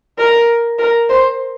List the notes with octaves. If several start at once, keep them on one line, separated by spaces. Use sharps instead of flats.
A#4
A#4
C5